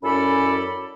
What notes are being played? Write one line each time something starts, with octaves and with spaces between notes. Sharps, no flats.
F#2 C#4 E4 A4 D5 B5